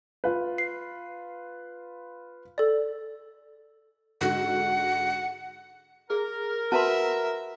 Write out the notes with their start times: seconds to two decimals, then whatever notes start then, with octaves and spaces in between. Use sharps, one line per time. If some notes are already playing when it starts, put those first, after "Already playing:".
0.24 F4 B4
0.58 C7
2.58 A4 D5
4.21 G#2 D3 F#4 F#5
6.10 G#4 A#4
6.72 F#4 B4 E5 A5 A#5 C6